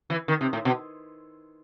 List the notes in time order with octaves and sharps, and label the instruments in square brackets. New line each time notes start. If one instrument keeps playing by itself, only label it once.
[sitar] E3
D#3
C3
A2
B2